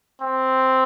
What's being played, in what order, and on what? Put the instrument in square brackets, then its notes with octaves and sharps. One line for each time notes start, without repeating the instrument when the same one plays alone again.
[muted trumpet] C4